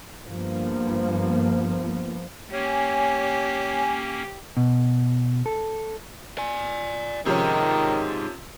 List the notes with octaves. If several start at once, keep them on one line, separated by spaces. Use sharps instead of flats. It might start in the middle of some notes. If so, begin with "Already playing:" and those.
G2 F3 A#3 B3
A#3 C#4 G4 C#5 G#5
B2
A4
D5 G#5
C3 D#3 F3 C#4 D#4 G#4